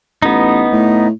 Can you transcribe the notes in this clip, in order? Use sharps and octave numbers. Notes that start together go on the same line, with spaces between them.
A1 B3 D#4
A2